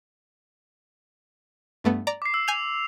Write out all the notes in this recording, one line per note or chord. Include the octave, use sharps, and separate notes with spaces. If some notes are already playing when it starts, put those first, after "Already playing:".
G2 A3 B3
D5 A#5
D6 C7
E6
G#5 G6 F7